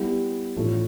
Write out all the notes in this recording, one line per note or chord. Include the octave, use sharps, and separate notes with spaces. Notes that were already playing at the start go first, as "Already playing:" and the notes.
Already playing: G3 B3 E4 G4
A2 E3 A3 D4 F4